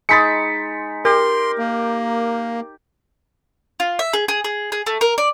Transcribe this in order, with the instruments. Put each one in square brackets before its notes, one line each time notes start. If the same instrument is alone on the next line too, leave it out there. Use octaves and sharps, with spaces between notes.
[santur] G#3 D#4 B5 [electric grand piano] A6 B6 C#7
[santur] G4 [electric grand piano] A#4 [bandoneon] C6
[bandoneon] A#3
[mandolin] F4
E5
G#4
G#4
G#4
G#4
A3
A#4
D5